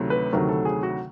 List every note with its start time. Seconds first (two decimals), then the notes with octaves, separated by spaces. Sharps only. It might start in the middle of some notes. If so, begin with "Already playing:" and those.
Already playing: D2 C3 D#3 F#3 A3
0.10 B4
0.32 D2 C3 D#3 F#3 A3 A#4
0.49 A4
0.65 G#4
0.83 F#4